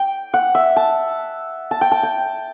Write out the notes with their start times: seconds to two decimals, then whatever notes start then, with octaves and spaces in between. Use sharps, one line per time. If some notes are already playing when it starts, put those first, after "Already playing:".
Already playing: G5
0.34 F#5
0.55 E5
0.76 A5
1.71 A5
1.81 G5
1.91 A5
2.03 G5